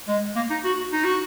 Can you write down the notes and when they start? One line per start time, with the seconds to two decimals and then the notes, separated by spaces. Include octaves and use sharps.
0.08 G#3
0.36 A#3
0.50 D#4
0.64 F#4
0.92 D#4
1.04 F#4